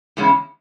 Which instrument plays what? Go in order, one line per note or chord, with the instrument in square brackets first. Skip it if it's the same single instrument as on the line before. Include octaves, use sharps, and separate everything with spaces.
[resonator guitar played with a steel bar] E2 C#3 G#3 C#4 E4